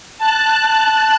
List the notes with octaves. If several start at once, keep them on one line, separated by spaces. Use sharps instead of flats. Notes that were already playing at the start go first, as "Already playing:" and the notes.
A5 F#6